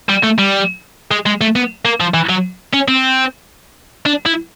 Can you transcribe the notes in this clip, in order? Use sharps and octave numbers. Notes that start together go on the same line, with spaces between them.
G3
A3
G3
G#3
G#3
A3
B3
A#3
F3
E3
F#3
C#4
C4
D4
E4